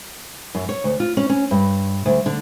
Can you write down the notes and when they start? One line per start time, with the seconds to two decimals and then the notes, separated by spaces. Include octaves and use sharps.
0.55 F#2
0.69 C#5
0.84 D2
1.00 F4
1.17 C#4
1.30 C#4
1.51 G2
2.06 D2
2.26 D3